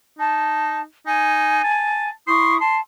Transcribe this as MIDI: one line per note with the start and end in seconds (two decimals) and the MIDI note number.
0.19 0.84 63
0.19 0.81 81
1.06 1.62 63
1.06 2.10 80
1.64 2.10 81
2.27 2.59 64
2.27 2.55 84
2.27 2.59 85
2.27 2.59 87
2.60 2.81 81
2.60 2.78 84